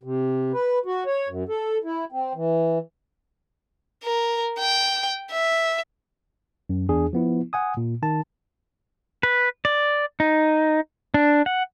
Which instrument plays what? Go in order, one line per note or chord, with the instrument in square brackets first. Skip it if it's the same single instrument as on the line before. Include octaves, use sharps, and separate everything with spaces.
[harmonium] C3
B4
F#4
C#5
F#2
A4
E4
C4
E3
[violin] A#4
G5
E5
[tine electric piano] F#2
E2 D4 G#4
F3 B3 E4
F#5 G#5 D#6
A#2
D#3 A5
[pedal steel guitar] B4
D5
D#4
D4
F#5